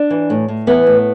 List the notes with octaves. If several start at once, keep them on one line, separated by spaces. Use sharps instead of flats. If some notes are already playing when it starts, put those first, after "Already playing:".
Already playing: D4 D5
E3
A2
A2
E3 B3 B4
A2